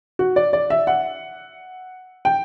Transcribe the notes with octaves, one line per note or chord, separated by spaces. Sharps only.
F#4
D5
D5
E5
F#5
G5